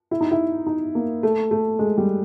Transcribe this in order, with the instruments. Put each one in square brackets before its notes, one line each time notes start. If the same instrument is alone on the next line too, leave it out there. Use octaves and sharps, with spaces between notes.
[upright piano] E4
D#4
E4
D#4
A#3
A3
A3
G#3
G3